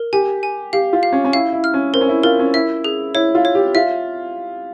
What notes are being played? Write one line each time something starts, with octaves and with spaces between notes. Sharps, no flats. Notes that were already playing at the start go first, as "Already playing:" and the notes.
Already playing: A#4
G4 G#5
G#5
G4 F5
F4
F5
C#4
C#4
E4 F5
E4
F6
C#4
C4 A#4
C#4
E4
F4 A#4
C#4
E4 E5
G#4
E4 C#5
F4
C#5
G4
F4 E5